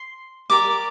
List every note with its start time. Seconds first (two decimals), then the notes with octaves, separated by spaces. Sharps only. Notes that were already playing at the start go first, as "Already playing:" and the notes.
Already playing: C6
0.50 G4 A#4 D5 D6